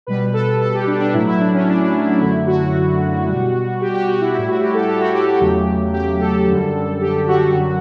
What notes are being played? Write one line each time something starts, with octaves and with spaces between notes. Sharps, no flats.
B2 G3 B4
A4
A4
G4
D4
D4
A2 F#3 A3 E4
E4
D4
C#4
D4
D4
D4
E4
F#2 D3 F#3 A3 E4
F#4
B2 G3
G4
G4
F#4
E4
A2 G3 E4
F#4
G4
A4
G4
F#4
G4
E2 C#3 F#3 A3 G4
G4
A4
F#2 D3 G3
G4
F#4
F#2 D3 F#3